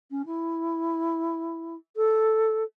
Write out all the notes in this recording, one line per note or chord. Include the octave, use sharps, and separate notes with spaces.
C#4
E4
A4